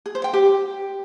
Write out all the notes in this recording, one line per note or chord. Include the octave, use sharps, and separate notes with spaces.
G#4
C5
G5
G4